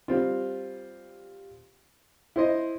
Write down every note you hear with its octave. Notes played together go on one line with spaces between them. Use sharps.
G3 C4 F4
E4 C5 D#5